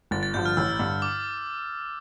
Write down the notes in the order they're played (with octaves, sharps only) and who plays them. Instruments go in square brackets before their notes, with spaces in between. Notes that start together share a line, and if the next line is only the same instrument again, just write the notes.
[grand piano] G1 [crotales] A6
[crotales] A6
[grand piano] G2 D3 F3 [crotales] G6
[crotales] F6
[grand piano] A1 [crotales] E6
[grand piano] G2 D3
[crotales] D6